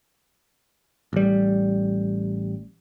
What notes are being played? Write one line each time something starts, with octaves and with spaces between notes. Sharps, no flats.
A1 G3